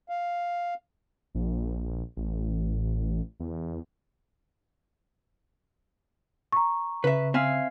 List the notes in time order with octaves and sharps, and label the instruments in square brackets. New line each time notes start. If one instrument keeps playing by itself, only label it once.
[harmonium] F5
[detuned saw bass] A#1
A1
E2
[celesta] A#5 C#6
[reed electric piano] C#3 [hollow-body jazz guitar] B4 E5
[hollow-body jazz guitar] C4 [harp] E5 F5 G#5